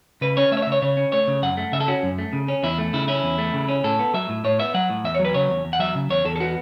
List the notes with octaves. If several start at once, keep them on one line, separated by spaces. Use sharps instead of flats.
C#3 B4
C#4 C#5
A3 E5
C#5
E5
C#3
C#5
C#3 C#5
C#4
A3 C#5
C#3
F#2 F#5
A3
C#3 E5
A4
C#4 F#4
F#2
A3
C#3
C#4
E2 E4
A3
C#3 E4
C#4 E4
E2
A3
C#3
C#4
A2 A4
B3
F#3 E5
A2
A2 C#5
B3 E5
F#3 F#5
A2
E2 E5
C#5
F#3
B4
C#3 C#5
E2
E2
F#5
F#3 E5
C#3
E2 C#5
E2 A4
A4
B3 F#4